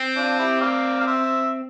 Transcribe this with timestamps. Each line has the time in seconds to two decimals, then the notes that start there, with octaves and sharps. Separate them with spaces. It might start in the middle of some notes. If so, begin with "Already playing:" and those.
Already playing: C4
0.16 D4 F4
0.39 E4 G4
0.61 D5 F5
1.00 F5
1.07 C5 E5